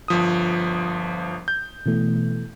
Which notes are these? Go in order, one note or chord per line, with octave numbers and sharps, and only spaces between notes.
G1 F3 D#6
G6
B2 E3 A3